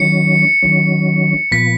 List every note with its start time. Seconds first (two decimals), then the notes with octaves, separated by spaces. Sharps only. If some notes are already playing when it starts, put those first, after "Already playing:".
Already playing: D#3 F#3 C#4 C#7
0.63 D#3 F#3 C#4
1.51 A#2 F3 B3 B6